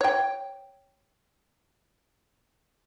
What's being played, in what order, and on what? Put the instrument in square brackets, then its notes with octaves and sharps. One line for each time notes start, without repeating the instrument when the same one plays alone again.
[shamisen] C#5 G5